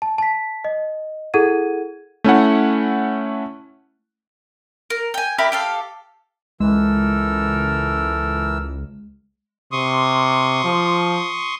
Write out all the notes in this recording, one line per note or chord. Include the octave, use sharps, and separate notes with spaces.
A5
A5 B6
D#5
E4 G#4 A4 F#5 G#6 D#7
A3 C#4 E4 F#5
A#4
G5 G#5
E4 G4 A#4 B5
G4 A4 F5
C#2 E3 G#3 A4 A#4 E6
C3 C6 C#6 D#6
F3